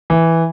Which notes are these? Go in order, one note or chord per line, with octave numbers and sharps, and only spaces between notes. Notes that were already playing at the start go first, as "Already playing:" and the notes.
E3